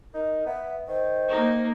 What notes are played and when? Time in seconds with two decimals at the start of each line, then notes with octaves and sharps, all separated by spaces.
0.14 D#4 A#4
0.46 B3 E5
0.88 D#3 C5
1.28 A#3 D#4